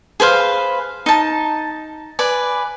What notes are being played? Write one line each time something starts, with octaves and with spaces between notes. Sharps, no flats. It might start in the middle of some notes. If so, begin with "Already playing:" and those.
G#4 B4 C5 F5
D#4 A5
B4 D5 G#5